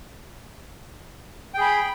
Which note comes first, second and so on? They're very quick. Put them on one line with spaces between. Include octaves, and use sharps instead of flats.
G5 G#4 B5